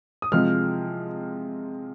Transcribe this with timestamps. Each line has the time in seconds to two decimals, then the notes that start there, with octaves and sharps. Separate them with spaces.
0.22 D#6
0.32 C3 F3 G#3 F6